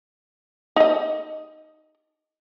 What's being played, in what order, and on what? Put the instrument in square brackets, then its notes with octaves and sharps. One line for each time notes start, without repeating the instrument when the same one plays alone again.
[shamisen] D#4 D#5